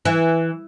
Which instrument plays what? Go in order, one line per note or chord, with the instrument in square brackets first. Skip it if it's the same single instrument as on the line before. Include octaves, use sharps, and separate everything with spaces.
[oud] E3